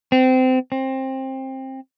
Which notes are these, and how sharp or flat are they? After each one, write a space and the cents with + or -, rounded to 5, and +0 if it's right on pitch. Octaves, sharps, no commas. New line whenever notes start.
C4 -25
C4 +20